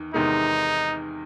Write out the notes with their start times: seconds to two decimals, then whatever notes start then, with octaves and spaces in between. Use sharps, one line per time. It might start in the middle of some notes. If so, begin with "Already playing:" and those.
Already playing: E2 D#3
0.14 E2 C3 D#3 G#3 D#4